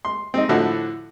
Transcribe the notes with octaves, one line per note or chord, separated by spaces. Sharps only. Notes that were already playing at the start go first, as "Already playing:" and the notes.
C6
C4 D#4
A2 D3 F3 E4 F#4